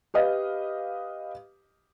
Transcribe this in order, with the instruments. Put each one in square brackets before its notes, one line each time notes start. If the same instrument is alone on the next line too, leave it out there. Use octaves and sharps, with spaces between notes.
[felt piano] G4 B4 D#5 F5